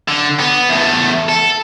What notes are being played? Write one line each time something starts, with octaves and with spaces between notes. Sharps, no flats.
D3
B3
E2 A3
A4